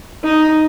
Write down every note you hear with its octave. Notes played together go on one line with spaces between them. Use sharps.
D#4